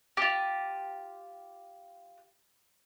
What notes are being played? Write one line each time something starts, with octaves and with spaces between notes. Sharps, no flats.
F4 G4